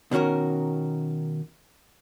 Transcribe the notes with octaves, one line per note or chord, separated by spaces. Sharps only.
B2 D#3 C#4 F#4 A#4